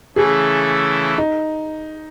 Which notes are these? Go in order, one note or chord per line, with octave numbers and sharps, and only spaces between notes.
C#3 E3 A3 E4 G#4 A4
D#4